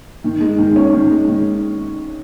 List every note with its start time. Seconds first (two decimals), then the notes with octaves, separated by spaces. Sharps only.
0.24 D#3
0.41 G#3
0.58 D#3
0.76 C#4
0.93 D#3
1.10 G#3
1.28 D#3